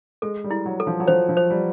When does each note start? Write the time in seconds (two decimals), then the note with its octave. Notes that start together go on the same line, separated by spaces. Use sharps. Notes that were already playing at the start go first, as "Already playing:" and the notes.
0.22 G#3 A4
0.44 G3
0.51 E4
0.66 F#3
0.80 A4
0.87 F3
1.00 F#3
1.08 F3 C5
1.29 F3
1.37 C5
1.50 G3